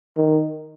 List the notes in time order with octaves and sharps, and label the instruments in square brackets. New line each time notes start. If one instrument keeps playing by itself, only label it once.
[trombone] D#3